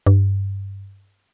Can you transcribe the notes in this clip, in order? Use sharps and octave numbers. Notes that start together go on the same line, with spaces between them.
G2